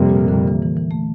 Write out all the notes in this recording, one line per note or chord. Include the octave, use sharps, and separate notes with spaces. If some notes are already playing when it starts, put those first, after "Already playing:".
Already playing: F2 C3 G3 A#3
A#2
D3
E3
E3
E3
A3